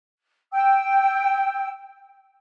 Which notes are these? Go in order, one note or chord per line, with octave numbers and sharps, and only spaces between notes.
G5 E6